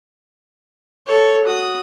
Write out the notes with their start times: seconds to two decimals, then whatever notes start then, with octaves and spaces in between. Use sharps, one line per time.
1.07 A4 C#5
1.44 F#4 D#6